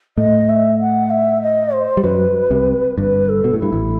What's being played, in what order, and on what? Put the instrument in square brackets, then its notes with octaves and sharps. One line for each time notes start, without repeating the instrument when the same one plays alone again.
[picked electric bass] A2 A3 [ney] D#5
[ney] E5
F#5
E5
D#5
C5
[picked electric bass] G3
[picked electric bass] F#2 F#3 [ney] B4
[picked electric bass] C2 C3
[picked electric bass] G1 G2 [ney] B4
[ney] A4
[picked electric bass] B2
A2
[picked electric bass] G2 [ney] E4
[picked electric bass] A1 A2